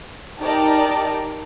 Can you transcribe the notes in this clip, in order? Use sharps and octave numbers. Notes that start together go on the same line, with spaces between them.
D#4 G4 A#4 D5 A5